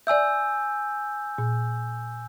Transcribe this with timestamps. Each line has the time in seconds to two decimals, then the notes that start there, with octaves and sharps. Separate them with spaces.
0.07 D5 E5 G#5 E6 G6
1.38 A#2